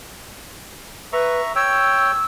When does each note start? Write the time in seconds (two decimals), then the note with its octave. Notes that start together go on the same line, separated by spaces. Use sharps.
1.13 B4 E5 A#5 C#6
1.56 C#5 G5 E6